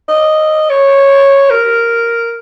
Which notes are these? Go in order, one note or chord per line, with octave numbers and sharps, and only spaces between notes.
D#5
C#5
A#4